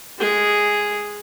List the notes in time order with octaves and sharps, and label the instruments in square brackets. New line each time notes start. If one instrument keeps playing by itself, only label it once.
[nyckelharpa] G#3 G#4